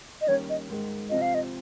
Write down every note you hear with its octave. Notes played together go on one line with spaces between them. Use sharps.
D#5
D#3 G3 A#3 C#4 C#5
D#5
G#2 D#3 G#3
C3 F3 C4 F4 D#5
F5
D#5